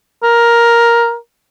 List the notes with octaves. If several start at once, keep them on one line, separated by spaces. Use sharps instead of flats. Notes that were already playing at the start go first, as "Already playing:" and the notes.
A#4